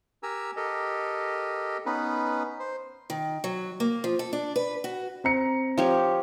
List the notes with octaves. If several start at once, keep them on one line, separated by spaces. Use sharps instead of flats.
G4 A#4 G#5 A#5 E6
G4 A4 A#4 D#5
B3 C#4 D#4 B4
C5
D#3
F#3
A#3
F3
A4
D4
B4
F#4
C4 A#5 C#7
F3 G4 C#5